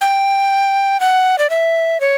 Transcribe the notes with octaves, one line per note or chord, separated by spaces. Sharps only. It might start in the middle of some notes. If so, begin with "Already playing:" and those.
G5
F#5
D5
E5
C#5